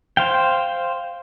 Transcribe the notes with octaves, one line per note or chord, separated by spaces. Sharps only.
C5 F5 G5